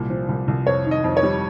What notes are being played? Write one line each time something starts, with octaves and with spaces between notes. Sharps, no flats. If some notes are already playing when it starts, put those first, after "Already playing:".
Already playing: C2 A#2
F3
C2
C2
F2 C#5
D#3
D#5
F2
C#5
G3